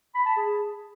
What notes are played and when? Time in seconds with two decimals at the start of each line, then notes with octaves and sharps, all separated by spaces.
0.15 B5
0.26 A5
0.36 G#4